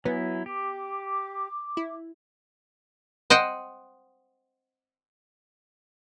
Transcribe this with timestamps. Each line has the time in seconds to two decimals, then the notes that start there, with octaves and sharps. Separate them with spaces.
0.05 F#3 B3 E4 G#5
0.46 G4 D6
1.77 E4
3.30 C5 D#5 F#5 G5